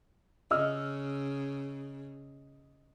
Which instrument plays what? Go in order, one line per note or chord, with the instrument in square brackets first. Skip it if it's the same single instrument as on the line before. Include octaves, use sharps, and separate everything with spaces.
[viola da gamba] C#3 [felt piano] D#5 E6 F6